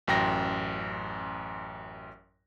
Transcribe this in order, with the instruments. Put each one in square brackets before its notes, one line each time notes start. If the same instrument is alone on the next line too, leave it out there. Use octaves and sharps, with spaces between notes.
[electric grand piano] A1 F#2 G5 A#6